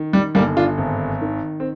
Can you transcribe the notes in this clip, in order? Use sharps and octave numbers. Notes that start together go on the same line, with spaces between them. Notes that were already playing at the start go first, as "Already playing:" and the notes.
Already playing: D#3
G3
G1 G3 A#3
D4 F4
G#1
D#3
C4